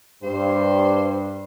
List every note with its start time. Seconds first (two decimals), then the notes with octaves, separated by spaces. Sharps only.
0.23 G2 C5